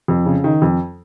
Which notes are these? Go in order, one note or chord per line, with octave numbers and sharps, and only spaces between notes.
F2
C#3
D#3
F2